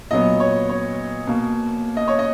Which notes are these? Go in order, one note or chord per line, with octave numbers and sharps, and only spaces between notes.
A#2 F#3 B3 D#5
C#5
C#5
B2 A#3
D#5
C#5
D#5